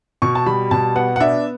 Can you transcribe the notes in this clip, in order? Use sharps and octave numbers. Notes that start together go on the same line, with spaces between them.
B2 C#6
A5
G3 B5
B2 A5
B3 F#5
F#5
D4 E5